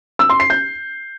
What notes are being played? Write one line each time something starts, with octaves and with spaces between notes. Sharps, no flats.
E6
C6
C7
G6